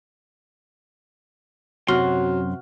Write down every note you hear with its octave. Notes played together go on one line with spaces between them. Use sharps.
F#2 C3 F#3 F#4 C6 F6